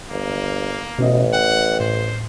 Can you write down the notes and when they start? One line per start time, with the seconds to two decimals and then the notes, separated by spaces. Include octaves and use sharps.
0.10 G1 A#3
0.99 A1 B2 C#4 D#5
1.33 F#5 G5
1.80 A2 C5